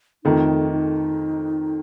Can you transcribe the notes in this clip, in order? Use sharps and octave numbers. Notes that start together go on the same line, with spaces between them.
F2 D#3 A3 D#4
D#4